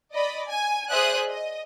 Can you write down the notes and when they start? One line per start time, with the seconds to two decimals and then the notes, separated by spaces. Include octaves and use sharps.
0.15 D5 D#5 B5
0.48 G#5
0.91 G#4 C5 D5 E5 D#6 F#6
1.28 D#5